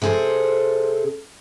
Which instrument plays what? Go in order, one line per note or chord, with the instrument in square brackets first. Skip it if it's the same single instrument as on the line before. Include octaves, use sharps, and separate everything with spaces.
[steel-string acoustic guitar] C3 C4 G#4 A4 C5